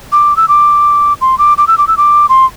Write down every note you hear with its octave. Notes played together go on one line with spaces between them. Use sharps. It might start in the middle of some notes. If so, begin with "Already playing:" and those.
D6
E6
D6
C6
D6
D6
E6
D6
E6
D6
C6